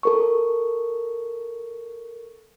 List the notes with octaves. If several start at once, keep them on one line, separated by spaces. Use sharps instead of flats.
A4 A#4 C#6